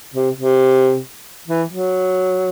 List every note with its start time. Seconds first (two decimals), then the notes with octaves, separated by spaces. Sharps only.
0.14 C3
0.36 C3
1.48 E3
1.70 F#3